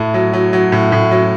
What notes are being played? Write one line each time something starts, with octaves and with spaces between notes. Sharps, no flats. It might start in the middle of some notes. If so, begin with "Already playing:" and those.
Already playing: A2
F#3
F#3
F#3
A2
A2
F#3